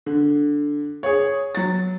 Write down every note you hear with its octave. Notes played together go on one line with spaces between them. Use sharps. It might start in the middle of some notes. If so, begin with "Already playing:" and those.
D3
G#4 C#5
F#3 A6